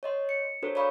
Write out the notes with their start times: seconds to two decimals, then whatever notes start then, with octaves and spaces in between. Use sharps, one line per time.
0.03 C#5 D#5 C6
0.29 C#7
0.62 D4 F#4 A4 A#4 C5 C#5
0.75 C#5 D5 F5 B5 C#6 D#6